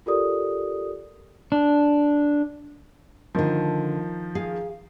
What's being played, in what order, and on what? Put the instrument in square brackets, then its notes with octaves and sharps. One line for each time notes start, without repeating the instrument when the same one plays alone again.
[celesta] F4 G4 A4 A#4 D5 D#6
[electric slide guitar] D4
[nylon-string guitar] D3 A3 [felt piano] D#3 F3
[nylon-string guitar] G#4 F5